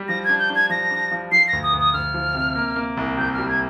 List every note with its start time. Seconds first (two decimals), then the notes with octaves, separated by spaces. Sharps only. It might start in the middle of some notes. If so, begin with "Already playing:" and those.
Already playing: G3
0.08 F3 A#6
0.24 D4 G#6
0.39 G6
0.50 D4
0.55 G#6
0.70 F3 A#6
0.91 D4
1.12 F3
1.32 F3 C7
1.48 D2 A#6
1.63 D#6
1.73 D2
1.79 D#6
1.94 D2 F6
2.14 F3
2.35 C3
2.56 A#3
2.76 A#3
2.97 C2
3.18 C3 G6
3.34 G3 F6
3.49 G#6